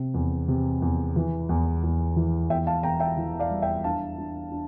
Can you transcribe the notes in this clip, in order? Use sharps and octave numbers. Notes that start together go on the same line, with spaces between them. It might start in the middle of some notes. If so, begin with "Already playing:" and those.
Already playing: C3
E2
C3
E2
E3
E2
E2
E3
E2 E5 G5
F5 A5
E1 G5 A#5
E5 G5
E3
D5 F5
G3
E5 G5
D4 F5 A5
D4
D4